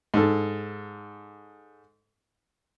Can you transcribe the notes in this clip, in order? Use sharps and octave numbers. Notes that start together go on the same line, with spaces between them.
G#2 A4